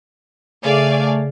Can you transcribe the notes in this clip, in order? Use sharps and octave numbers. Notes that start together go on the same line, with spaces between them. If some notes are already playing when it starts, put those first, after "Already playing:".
C#3 A3 G#4 D5 F5 G#5